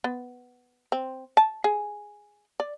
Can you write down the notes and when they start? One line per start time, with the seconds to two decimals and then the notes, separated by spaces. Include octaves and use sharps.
0.04 B3
0.92 C4
1.37 A5
1.64 G#4
2.60 D5